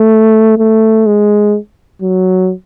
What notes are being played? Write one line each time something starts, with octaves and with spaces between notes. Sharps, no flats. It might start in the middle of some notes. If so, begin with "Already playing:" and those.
Already playing: A3
A3
G#3
F#3